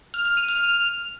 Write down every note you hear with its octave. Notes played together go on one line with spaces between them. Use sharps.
F6
F6
D#7
F6